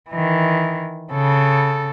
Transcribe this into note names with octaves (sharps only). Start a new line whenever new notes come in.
D#3 E3
C#3 A4